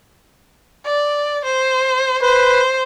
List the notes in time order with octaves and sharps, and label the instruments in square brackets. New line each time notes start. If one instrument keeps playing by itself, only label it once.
[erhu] D5
C5
[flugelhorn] B4 [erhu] C5